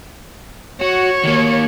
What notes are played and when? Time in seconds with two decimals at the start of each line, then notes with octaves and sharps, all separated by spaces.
0.81 F#4 C#5
1.24 D#3 A#3